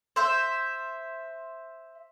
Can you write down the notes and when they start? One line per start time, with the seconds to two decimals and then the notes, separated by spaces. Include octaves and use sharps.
0.16 C5 E5